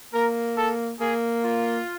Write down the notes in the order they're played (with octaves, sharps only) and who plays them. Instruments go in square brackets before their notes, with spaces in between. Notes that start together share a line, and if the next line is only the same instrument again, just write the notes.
[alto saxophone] A#3 [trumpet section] A#4
[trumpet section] A4
[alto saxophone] A#3 [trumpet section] G#4
[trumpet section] F4